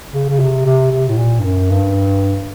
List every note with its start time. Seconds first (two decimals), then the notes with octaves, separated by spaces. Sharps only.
0.14 C#3
0.29 C#3
0.40 C3
0.66 C3
0.92 C3
1.09 A2
1.18 A#2
1.40 G2
1.44 F#2
1.70 G2